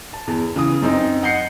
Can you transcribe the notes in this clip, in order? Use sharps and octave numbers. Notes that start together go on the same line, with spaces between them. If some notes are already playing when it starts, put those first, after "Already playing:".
A5
E2
C#3 E3 D#6
F#2 C4 D#4
D#5 F#5 G6 C7 C#7